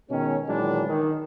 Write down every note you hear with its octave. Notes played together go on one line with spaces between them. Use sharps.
B2 D#3 G#3 C#4
A#2 D#3 E3 F#3 G#3 D4
D#3